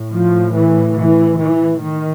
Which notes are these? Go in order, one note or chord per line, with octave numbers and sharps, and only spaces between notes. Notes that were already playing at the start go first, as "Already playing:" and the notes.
Already playing: A2
F3
E3
E3
E3
D#3